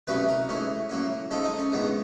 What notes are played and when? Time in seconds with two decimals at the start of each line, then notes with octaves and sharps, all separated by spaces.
0.07 C2 B2 F#3 A3 C#4 B4
0.28 A#4
0.49 G#2 E3 A3 C#4
0.89 A2 F#3 A#3 C#4
1.31 G#2 F3 G#3 C#4 A4
1.44 D#4
1.59 C#4
1.72 A#1 G#2 D#3 G#3 B3